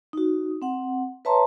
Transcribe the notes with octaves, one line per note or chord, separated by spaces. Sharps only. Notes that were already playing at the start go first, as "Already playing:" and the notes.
D#4 F#4
C4 F#5
B4 C#5 E5 A5 A#5 C6